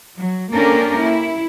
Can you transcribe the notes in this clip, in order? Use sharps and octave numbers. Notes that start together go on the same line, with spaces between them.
F#3
A#3 C#4 D4 G4 A4 A#4
E4